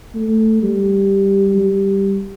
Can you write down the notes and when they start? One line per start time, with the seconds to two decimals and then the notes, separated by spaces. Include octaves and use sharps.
0.15 A3
0.63 G3
1.59 G3